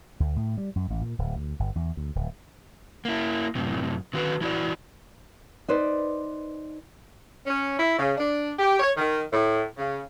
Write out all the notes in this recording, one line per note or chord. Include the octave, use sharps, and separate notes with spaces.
D2
A2
G3
F#2
A1
A#2
D1
D2
G1
E2
D2
D1
A#3 E4
F#2 A2 C3
D3 D#3 F#4 B4
E3 E4 F#4 D5
D#4 B4 C5 D5
C#4
E4
C#3
D4
G4
C#5
D#3
A2
C#3